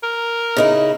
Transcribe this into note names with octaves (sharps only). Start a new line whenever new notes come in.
A#4
C#3 D#4 E4